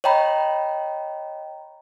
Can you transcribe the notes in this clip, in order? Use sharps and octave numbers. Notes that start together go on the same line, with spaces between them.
C#5 D#5 G5 A#5 B5